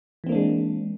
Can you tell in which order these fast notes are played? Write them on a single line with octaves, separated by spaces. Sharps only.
E3 C4 A#3 D4 G#3